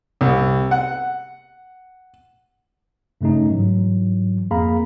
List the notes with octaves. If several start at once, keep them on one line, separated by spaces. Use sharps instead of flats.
C2
F#5
G2 C#3 A3 C#4 D#4
G#2 E3 F#3
F2 A#3 G#4 F5 A#5 B5